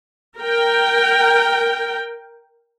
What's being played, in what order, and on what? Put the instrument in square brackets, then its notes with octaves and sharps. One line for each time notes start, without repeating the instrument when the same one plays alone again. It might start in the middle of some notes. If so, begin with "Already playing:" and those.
[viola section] A#4 G5